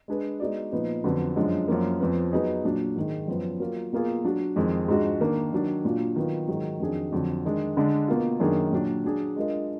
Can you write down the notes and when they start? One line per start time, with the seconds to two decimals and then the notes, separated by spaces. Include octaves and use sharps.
0.08 G#3 D4 G#4 B4
0.40 G#3 B3 D#4 F#4 D5
0.72 A#2 F3 B3 D#4
1.04 F2 D3 F#3 B3
1.36 F#2 F3 G#3 D4
1.68 F#2 F3 A#3
2.00 F2 F3 B3
2.32 F#3 B3 D#4 G#4
2.65 A#2 F#3 D4
2.96 G#2 D#3 G#3
3.28 F#2 F3 B3
3.60 F#3 A#3 F4 A#4
3.93 B2 A#3 F4 G#4
4.25 F#3 D4 F#4
4.56 F2 D#3 G#3
4.88 G#2 F3 G#3 D4 F#4
5.20 D#3 A#3 D4
5.53 D#3 F#3 D4
5.85 A#2 F#3 D4 F4
6.16 D#3 F#3 B3 F4
6.48 G#2 D#3 F#3
6.80 F2 D#3 F#3 D4 G#4
7.12 F2 D3 F#3
7.44 D#3 G#3 D4
7.77 D3 G#3 D4
8.08 B2 A#3 F4
8.40 F#2 D#3 A#3 D4 G#4
8.72 A#2 F#3 D4
9.04 F#3 D4 G#4
9.36 G#3 D4 F4 A#4 D#5